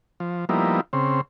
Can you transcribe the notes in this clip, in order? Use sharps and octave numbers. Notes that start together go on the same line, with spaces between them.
F3
F3 G3 A#3 B3 D#4 E4
C#3 C4